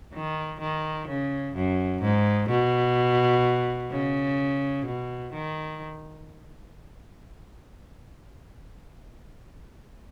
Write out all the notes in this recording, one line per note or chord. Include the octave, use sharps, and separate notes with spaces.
D#3
D#3
C#3
F#2
G#2
B2
C#3
B2
D#3